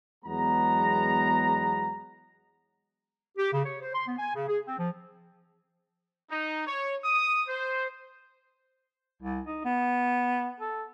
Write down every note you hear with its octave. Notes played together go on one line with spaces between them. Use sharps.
E2 F#3 G#3 B3 A#5
G4
C#3
C#5
C5
C6
B3
G#5
C#3
G#4
C4
F3
D#4
C#5
D#6
C5
C2
D#4
B3
A4